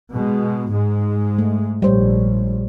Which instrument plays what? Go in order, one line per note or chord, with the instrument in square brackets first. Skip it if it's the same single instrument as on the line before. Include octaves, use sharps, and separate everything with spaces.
[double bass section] B2 G#3
G#2 G#3
[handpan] A3
[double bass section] A#1 [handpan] G3 C5 C#5